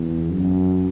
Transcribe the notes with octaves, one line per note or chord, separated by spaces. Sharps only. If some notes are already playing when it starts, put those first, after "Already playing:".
Already playing: E2
F#2